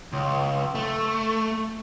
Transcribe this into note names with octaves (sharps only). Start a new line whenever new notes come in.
C#2
A3